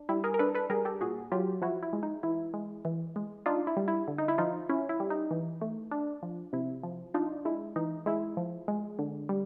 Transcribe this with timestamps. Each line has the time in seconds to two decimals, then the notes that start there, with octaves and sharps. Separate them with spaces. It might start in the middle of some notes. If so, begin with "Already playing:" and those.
Already playing: D4
0.09 G3 E4
0.24 G#4 A#4
0.34 A#4
0.39 D4 A4 B4
0.55 A4 B4
0.70 G3 G#4 A#4
0.85 G4 A4
1.01 A#2 F#4 G#4
1.32 F#3 F4 G4
1.62 F3 E4 F#4
1.83 E4
1.93 G#3
2.03 D#4
2.23 E3 E4
2.54 G#3
2.85 E3
3.16 G#3
3.46 D4 D#4 F4
3.67 E4
3.77 G3
3.88 E4
4.08 D3
4.18 D#4
4.28 E4
4.38 F3 D#4 F4
4.69 C#4 E4
4.89 E4
5.00 G3
5.10 D#4
5.31 E3
5.61 A3
5.91 D4
6.23 F3
6.53 C3 E4
6.83 F3
7.14 D4 D#4 F4
7.45 G#3 E4
7.76 E3 D#4
8.06 G#3 E4
8.37 F3
8.68 G#3
8.99 D3
9.29 G3